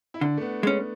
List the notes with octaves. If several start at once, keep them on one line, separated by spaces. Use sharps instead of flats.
E4
D3 D4
A3
B3
G#3 A3 C#4